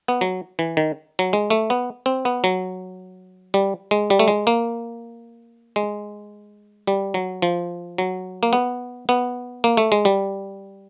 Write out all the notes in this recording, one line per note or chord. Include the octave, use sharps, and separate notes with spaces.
B3
F#3
E3
D#3
F#3
G#3
A3
B3
C4
B3
F#3
G3
G#3
G3
A3
G#3
A#3
G#3
G3
F#3
F3
F#3
A#3
B3
B3
A#3
A3
G#3
G3